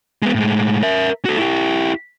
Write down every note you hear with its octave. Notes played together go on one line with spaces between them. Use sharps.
G#3 B3
A2 G#3
A#4 E5
F#4 A4
E4 G4